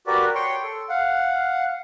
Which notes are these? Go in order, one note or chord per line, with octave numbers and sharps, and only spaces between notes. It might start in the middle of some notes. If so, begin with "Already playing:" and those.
F#4 G4 A#4 B4 D5
C#5 G5 C6 C#6
A4
F5 F#5